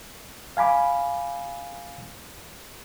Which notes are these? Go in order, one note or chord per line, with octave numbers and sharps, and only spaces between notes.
F5 G#5 B5 D6